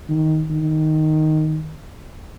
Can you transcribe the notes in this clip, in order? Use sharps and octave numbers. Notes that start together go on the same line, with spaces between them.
D#3
D#3